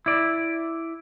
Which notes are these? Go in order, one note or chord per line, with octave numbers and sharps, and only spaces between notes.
E4 D5